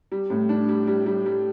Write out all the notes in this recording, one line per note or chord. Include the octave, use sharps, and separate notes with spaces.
G3
A2
D4
G3
G3
G3
G3